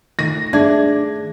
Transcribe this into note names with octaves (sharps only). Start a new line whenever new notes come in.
D#3 A3 A#6
D4 G#4 E5 A5 G#6